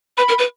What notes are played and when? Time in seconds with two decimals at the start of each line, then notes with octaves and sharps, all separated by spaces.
0.17 B4 B5
0.28 A#4
0.38 B4